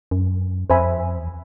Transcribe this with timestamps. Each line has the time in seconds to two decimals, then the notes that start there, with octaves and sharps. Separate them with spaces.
0.11 F#2
0.70 F2 C5 E5 G#5 B5
1.17 E2